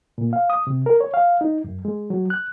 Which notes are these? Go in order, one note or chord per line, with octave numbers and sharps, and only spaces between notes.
A#2
F5
D#6
C3
A#4
C#5
F5
D#4
F#2
G#3
F#3
F#6